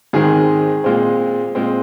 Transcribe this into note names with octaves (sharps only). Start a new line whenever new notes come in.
G#2 D#3 G#3 C4 G#4
A#2 G#3 C4
A#2 G#3 C4